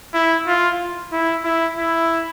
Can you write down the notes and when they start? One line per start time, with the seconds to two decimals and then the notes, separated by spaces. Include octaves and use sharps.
0.14 E4
0.47 F4
1.13 E4
1.44 E4
1.78 E4